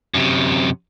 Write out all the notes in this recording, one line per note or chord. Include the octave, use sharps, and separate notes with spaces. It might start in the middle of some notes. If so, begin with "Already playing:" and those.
F#2 C3